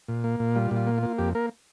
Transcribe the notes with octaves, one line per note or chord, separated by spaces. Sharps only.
A#2
A#3
A#2
G3 F4
A#2
F4
A#3
A#3 F4
F2 G4
A#3 A#4